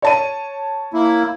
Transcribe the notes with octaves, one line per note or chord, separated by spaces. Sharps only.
C#5 A5 D#7
A#3 E4